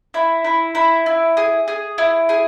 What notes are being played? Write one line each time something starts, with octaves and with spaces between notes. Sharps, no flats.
E4
E4
E4
E4
G#4
G#4
E4
G#4